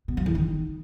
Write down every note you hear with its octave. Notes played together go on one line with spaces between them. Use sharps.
B2
F#2
E2
D#3